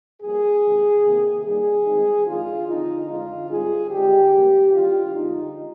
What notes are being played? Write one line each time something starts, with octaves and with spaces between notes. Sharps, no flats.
G2 F3 A#3 G#4
C3 D#3 G#3
C3 D#3 A#3 D#4
G2 D#3 G3 A#3 G#4
D#3 G#3 C4 D#4
F2 D#3 G#3 D4 F4
D3 F3 C4 D#4
F2 D3 G#3 C4 F4
G#2 G3 C4 D#4 G#4
D3 G#3 C4 D#4 G4
C3 G3 A#3
D#3 G3 D4 F4
F2 D3 G#3 D#4